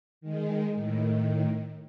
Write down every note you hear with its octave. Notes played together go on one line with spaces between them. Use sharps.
D#3 G#3
A2 D#3